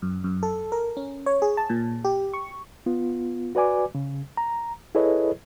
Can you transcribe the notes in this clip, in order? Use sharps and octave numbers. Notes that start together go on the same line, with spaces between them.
F#2
F#2
A4
A#4
C#4
C#5
G#4
A5
A#2
G4
C#6
B3 F4
F#4 B4 D5 G#5 D6
C#3
A#5
E4 G#4 A4 B4 C#5 D#5